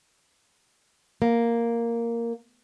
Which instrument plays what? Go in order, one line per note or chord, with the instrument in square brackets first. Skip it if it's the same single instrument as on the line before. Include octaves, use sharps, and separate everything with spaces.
[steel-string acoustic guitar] A#3